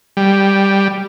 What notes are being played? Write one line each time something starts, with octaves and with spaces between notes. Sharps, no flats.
G3